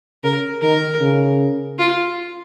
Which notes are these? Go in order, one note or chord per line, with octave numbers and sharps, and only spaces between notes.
C#3 A#4
D#3 A#4
C#3
F4